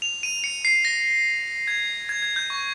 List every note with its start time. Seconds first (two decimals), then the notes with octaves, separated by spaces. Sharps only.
0.02 F7
0.23 D#7
0.44 C#7
0.65 C7
0.85 A#6
1.68 G#6
2.09 G#6
2.22 G#6
2.36 G6
2.50 C#6